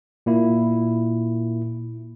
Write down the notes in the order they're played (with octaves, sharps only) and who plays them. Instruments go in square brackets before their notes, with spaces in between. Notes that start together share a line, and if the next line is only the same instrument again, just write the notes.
[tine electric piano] A#2 A#3 E4